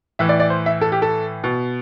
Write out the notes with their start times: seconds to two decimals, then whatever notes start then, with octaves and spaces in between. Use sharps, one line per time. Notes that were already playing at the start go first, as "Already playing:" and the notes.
0.19 A2 E3 E5
0.29 D5
0.40 D5
0.50 C5
0.66 E5
0.81 A4
0.92 G4
1.02 A4
1.44 B2